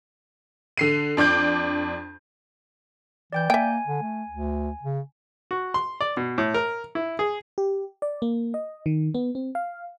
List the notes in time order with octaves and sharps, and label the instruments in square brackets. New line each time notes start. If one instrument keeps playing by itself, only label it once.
[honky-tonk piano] D3 C7 D#7
F2 D4 D6 G6
[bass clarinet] E3 [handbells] D5 G5 G6
[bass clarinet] A#3 [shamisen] E5 G5 [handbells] G#5
[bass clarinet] D3
A3
D2
C#3
[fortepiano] F#4
C6
D5
B2
A2
A#4
E4
G#4
[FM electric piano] G4
D5
A#3
D#5
D#3
B3
C4
F5